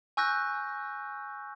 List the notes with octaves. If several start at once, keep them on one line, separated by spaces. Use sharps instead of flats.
G#5 C#6 E6 F#6 G6 A#6